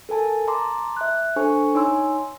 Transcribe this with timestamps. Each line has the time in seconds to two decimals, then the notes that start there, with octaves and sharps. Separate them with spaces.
0.09 A4 A#4 G#5 A5
0.48 A5 A#5 C6 D6
0.97 E5 F#6
1.36 D4 A4 C5 G#5 C#6
1.75 D#4 C#5 G#5 C6 E6